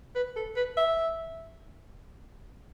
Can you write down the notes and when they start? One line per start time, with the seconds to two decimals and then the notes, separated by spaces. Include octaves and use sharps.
0.16 B4
0.36 A4
0.56 B4
0.77 E5